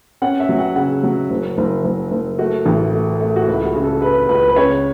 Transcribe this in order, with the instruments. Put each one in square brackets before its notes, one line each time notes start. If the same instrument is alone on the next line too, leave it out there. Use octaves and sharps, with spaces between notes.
[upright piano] C#4 F#5
E5
F#3
F#5
C#3 F#5
F#3
F#1
F#1
F#1
F#1
A3 F#4
A1
A3
A3
F#4
C#2 E4
F#4
C#3
A4
C#3 B4
C#2 B4
B4
C#3 C#5